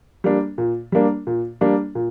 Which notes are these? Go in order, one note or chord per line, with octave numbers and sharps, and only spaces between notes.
G3 A#3 D4
A#2
G3 A#3 D4
A#2
G3 A#3 D4
A#2